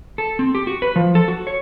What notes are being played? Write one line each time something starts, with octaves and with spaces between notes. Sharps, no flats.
A4
C4
G4
F#4
B4
F3
A4
F#4
C#5